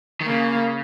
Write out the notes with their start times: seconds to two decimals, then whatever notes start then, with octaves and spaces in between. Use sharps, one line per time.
0.21 D#3
0.27 C#3 A#3